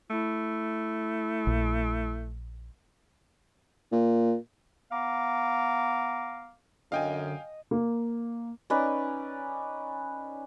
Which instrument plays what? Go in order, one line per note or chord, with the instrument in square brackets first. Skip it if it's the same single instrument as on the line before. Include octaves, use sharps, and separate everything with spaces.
[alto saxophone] A3 [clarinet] E4
[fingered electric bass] A#1
[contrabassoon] A#2
[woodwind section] B3 F5 A#5 D6
[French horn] F#2 [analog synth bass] D3 [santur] D#5 [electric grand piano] F5 G5 G#5
[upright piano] A#3
[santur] C#4 D#4 B4 D5